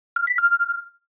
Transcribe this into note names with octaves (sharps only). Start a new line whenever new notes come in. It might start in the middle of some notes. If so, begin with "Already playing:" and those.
F6
B6
F6